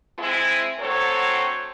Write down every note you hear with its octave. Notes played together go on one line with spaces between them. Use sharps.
G#3 C4 E4
D2 F#3 C4 A4 C5 C#5